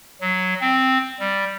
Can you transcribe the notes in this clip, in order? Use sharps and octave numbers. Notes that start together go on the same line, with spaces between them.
F#3
C4
G3